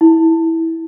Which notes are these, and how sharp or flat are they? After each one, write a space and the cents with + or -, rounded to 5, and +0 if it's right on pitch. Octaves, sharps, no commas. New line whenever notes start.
E4 -15